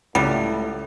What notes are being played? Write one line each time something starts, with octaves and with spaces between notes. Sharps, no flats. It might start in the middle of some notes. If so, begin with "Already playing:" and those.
C#2 A2 G3